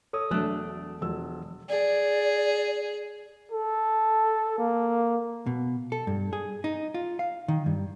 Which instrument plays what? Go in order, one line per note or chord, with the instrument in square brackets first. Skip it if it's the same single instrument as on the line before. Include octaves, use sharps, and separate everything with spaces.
[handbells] A4 D#6 [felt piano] C#5
[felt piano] E1 F#6 [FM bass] F#3 [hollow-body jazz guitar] A3 D4
[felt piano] E1 F3 E6
[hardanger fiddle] G#4 [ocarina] D5
[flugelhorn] A4
A#3
[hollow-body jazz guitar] B2
A4
G2
G#4
D#4
F4
F5
D#3
G2